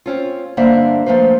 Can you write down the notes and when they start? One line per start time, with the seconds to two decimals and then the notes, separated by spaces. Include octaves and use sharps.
0.06 C4 C#4 F4
0.57 G2 D3 A#3 D4 C5 E5
1.06 F3 A3 A#3 B4 C5